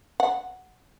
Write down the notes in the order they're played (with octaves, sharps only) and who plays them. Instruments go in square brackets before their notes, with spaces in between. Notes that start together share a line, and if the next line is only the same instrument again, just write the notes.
[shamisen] F#5